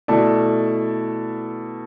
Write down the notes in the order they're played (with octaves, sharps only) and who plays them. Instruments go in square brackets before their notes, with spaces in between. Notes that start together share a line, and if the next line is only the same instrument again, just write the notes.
[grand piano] B2 A3 E4 A4 D5